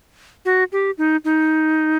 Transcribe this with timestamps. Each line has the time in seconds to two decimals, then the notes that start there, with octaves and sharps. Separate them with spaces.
0.45 F#4
0.72 G4
0.98 D#4
1.25 D#4